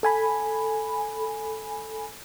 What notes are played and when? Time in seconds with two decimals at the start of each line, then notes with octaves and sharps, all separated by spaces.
0.03 A4 G#5 B5